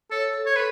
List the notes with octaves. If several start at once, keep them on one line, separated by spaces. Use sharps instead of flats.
A4 C#5
A4
C#5
A4 B4